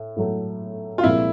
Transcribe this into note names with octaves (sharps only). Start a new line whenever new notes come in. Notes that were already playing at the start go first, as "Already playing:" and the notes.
Already playing: A2
A2 F#3 A3
F4
C2 A#2 F3 G#3 E4